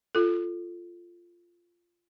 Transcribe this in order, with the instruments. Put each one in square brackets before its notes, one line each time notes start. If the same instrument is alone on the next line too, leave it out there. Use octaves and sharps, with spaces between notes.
[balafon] F4 A4